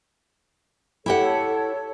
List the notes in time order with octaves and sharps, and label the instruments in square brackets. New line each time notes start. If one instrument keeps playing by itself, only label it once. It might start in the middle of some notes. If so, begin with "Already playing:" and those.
[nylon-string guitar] E4 G4 F#5 [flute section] A4 C#5